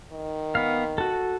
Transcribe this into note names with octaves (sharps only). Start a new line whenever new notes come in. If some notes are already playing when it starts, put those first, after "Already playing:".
D#3
B3 F5
F#4 A4